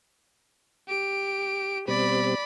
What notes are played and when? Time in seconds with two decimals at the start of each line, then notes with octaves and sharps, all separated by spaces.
0.88 G4 D7
1.88 B2 G3 C4 D5 B5